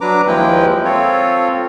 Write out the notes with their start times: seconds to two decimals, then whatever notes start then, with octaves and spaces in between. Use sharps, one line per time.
0.01 F#3 D4 B4 A#5 D6
0.28 D#2 F3 G#3 E4 B4 G5
0.85 C4 F4 A4 C#5